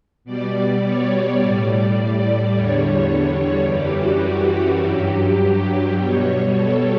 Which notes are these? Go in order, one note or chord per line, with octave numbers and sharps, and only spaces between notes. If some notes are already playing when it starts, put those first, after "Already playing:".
B2 G3 D5
C#5
A2 G3 D5
E2 D3 G3 C#5
F#2 E3 G3 G4
F#4
G4
G2 F#3
B2 G3 C#5
C#5
A4